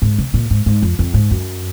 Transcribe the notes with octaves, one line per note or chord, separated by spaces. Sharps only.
G#2
C3
A#2
G#2
G#2
F2
F2
G#2
F#2